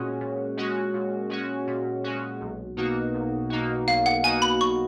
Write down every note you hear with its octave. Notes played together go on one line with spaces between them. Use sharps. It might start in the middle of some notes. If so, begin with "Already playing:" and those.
Already playing: A#2 G#3 C#4 F#4
A#2
G#3 C#4 F#4
A#2
G#3 C#4 F#4
A#2
G#3 C#4 F#4
B1
B2 A#3 D#4 F#4
B1
B2 A#3 D#4 F#4
B1 F5
F#5
B2 A#3 D#4 F#4 G#5
B5
B1 C#6